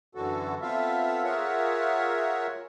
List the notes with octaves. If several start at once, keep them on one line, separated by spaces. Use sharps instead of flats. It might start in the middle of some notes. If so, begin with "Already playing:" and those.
F#2 D3 E3 F#4 A4
B3 C4 F4 A4 E5 F5
F4 G#4 A#4 C#5 E5 F#5